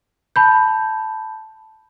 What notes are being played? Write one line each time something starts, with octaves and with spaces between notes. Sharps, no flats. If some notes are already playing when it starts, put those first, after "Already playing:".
A5 B5 G6